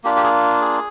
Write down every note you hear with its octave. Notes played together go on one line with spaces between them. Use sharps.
A#3 D4 F4 G4
G4
G#4
G#4